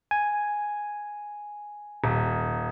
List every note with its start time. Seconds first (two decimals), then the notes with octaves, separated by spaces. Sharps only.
0.11 G#5
2.04 D#1